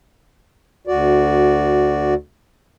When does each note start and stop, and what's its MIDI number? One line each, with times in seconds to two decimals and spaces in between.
0.87 2.14 38
0.87 2.14 66
0.87 2.14 74